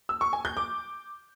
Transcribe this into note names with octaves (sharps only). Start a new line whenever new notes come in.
E6
C#6
G#5
G6
D6